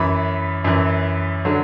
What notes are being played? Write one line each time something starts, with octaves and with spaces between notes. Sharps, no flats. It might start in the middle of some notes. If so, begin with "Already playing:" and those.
Already playing: F#2 E3 B5
F#2 E3
D3 F#3